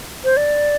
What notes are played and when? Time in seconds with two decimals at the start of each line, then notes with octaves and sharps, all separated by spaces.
0.24 C5
0.37 D5